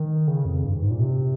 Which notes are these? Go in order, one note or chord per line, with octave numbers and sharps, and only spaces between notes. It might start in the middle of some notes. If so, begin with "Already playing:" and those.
Already playing: D#3
C#3
F2
G2
G#2
A#2
C3